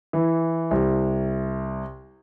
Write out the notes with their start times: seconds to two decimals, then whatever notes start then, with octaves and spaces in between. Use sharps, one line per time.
0.13 E3
0.71 C2